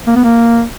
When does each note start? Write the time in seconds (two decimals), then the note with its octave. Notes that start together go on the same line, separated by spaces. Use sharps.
0.07 A#3
0.16 B3
0.24 A#3